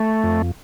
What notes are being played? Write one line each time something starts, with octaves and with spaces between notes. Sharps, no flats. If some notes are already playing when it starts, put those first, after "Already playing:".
Already playing: A3
F2